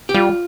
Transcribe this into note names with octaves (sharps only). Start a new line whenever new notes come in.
G4
G3 F4